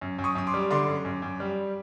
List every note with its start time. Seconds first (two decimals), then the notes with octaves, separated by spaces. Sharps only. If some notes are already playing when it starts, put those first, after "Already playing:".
0.01 F#2
0.18 F#2
0.24 C#6 D#6
0.35 F#2 D#6
0.47 C6 D6
0.54 G3
0.71 D3 C6 D6
0.88 F#2
1.05 F#2
1.22 F#2
1.40 G3